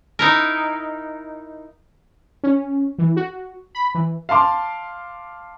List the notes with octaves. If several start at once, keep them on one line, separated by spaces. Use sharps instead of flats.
D#4 E4 A#4
C#4
E3
F#4
B5
E3
F5 A5 C6 D6